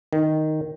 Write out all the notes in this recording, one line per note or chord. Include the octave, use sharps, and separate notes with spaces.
D#3